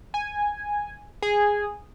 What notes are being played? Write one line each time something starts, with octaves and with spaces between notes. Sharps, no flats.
G#5
G#4